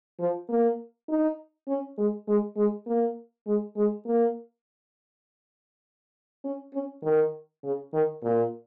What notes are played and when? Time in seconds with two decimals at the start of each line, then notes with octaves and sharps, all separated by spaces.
0.20 F3
0.49 A#3
1.09 D#4
1.68 C#4
1.98 G#3
2.28 G#3
2.57 G#3
2.87 A#3
3.47 G#3
3.77 G#3
4.06 A#3
6.44 C#4
6.74 C#4
7.04 D#3
7.64 C#3
7.93 D#3
8.23 A#2